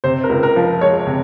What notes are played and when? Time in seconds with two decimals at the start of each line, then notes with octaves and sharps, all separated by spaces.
0.04 C3 C5
0.24 A#4
0.29 C#2
0.43 A#4
0.56 F3
0.81 G#3 C#5
1.07 C3